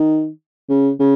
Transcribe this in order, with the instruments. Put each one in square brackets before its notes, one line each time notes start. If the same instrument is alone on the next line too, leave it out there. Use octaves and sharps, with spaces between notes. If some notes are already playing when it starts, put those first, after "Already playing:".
Already playing: [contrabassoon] D#3
C#3
C#3